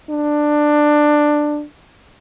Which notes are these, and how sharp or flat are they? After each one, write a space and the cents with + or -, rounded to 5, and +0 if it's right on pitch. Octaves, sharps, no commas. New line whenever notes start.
D4 +15